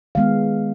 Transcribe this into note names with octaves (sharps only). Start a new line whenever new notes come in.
D#3 G#3 B3 F5